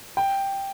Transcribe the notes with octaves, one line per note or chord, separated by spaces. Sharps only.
G5